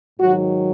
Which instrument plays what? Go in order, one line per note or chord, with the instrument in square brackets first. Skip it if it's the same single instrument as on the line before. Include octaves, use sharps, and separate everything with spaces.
[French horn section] G#2 D#3 F#3 F#4